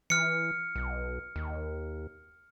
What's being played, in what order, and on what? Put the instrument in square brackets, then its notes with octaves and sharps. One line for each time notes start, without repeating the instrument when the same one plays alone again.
[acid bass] E3 [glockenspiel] F6 C#7
[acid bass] B1
D#2